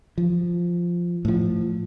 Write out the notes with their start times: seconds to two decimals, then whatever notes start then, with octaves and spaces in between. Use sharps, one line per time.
0.18 F3
1.25 A2 F3